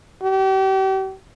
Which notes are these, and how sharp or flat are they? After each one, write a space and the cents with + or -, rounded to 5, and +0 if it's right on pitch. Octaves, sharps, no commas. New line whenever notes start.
G4 -40